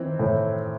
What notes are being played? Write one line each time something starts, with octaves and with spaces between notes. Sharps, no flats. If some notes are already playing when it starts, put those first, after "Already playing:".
Already playing: D#3 E3 C4
A2